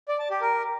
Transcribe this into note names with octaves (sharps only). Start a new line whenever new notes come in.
D5
A5
G4
A#4